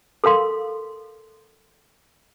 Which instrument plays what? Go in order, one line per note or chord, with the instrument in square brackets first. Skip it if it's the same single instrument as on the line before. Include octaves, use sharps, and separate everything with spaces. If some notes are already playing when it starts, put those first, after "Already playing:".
[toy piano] A4 A#4 F5 C6